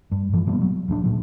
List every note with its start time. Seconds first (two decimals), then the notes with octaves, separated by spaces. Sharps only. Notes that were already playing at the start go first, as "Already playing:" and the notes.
0.11 G2
0.33 G2 E3 F3
0.47 B2 G3 A#3 B3
0.61 F#3
0.88 D#1 A#1 C#4 D4
1.04 A#2 F#3